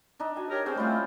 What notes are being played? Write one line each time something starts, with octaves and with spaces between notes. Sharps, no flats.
D4 D#4
F#4 G#5
G4 A#4 C#5
C4 C#4 G#4 C5
G3 A3 E4 F4